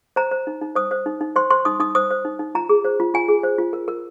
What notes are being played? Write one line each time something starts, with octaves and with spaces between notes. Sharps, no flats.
C5 A#5
C5
D#4
D#4
C5 D#6
C5
D#4
D#4
C5 C6
C5 C6
D#4 D#6
D#4 D#6
C5 D#6
C5
D#4
D#4
F4 A#5
G#4
C5
F4
F4 G#5
G#4
C5
F4
A#4
A#4